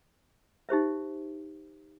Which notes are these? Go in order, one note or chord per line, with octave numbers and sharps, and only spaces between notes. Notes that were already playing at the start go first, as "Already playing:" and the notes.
D#4 G4 C5 E5